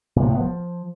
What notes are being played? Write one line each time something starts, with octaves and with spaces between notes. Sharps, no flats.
A#2
C3
A2
B3
F3